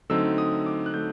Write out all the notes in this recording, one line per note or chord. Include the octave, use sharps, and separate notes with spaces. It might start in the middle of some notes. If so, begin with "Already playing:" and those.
D3 F#3 A3 C4 D#4 E6
D#6
D6
F#6
D3 F#3 A3 G6